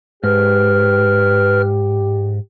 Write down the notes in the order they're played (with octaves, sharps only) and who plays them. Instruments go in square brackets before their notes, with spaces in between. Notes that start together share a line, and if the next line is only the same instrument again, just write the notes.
[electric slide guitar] G#2 [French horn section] G4 [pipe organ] B4 F6